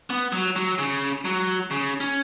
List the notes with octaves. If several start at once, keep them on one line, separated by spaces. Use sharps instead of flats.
B3
F#3
F#3
C#3
F#3
C#3
C#4